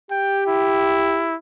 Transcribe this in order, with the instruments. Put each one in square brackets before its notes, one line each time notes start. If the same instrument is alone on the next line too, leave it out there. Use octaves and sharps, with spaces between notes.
[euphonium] G4 [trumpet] G5
[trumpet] E4